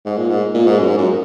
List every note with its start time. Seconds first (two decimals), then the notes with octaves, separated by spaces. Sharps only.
0.05 G#2
0.18 A#2
0.30 G#2
0.55 A#2
0.67 G#2
0.79 F#2
0.88 G#2
0.98 F#2